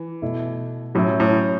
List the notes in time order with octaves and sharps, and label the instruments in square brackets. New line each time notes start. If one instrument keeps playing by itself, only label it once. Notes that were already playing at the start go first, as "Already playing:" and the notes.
Already playing: [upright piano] E3
[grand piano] B2 A3 E4
[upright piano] A2 [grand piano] F#3 C#4 E4
[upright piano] A2